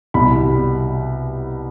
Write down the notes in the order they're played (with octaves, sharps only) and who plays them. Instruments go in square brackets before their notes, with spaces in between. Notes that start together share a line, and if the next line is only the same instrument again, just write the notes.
[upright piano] C2 B2 G3 B5